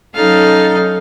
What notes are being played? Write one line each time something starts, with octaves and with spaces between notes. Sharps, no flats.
F#3 C#4 D#4 A4 F5